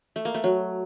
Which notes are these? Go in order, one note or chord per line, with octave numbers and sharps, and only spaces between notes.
A3
A#3
A3
F#3